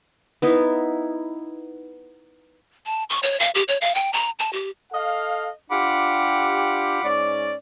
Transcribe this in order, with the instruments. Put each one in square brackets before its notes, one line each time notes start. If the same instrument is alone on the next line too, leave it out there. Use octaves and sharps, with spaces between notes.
[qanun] B3 D#4 E4
[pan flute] A5
C#6
C#5
F5
G4
C#5
F5
G5
A#5
A5
G4
[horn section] A4 D#5 F5
[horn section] D4 F4 G4 [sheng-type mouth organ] F#5 B5 D6
[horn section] G#2 C#4 D5